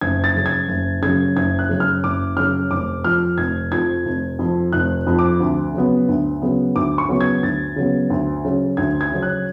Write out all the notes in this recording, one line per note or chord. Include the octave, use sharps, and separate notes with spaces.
F#1 G#6
A6
F#2 C#3
G#6
F#1
F#2 C#3 G#6
F#1 G#6
F#6
F#2 C#3
F6
F#1 D6
F#2 C#3 F6
F1 D6
F2 F3 F6
F1 G#6
F2 F3 G#6
F1
F2 F3
F1 F#6
F2 F3
D6
D2
C#3 F#3 B3
D2
C#3 F#3 B3
D2 D6
C#6
C#3 F#3 B3
G#6
D2 A6
C#3 F#3 B3
D2
C#3 F#3 C#4
D2 G#6
G#6
C#3 F#3 C#4
F#6